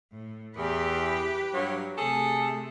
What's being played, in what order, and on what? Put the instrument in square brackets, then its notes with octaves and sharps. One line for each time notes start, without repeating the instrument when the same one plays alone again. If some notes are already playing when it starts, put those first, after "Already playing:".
[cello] A2
[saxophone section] E2 [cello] G4 B4
[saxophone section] G2 F#3
[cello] C3 A3 [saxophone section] G#4 A4